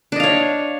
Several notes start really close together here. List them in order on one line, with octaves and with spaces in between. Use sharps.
D4 D#5 F5 C#5